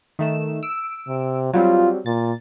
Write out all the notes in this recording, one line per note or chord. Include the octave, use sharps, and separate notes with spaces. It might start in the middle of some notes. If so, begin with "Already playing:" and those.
D#3 A3 E7
E6 D7
C3
F#3 G3 C4 F4
A#2 A6